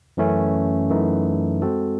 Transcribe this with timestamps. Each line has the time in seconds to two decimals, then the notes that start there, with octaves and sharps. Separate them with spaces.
0.17 F#2 E3 A3 C#4
0.90 F#2 E3 A3 D#4
1.62 G#3 C4 F#4 A4